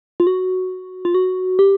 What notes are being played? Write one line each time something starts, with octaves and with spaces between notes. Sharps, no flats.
F4
F#4
F4
F#4
G4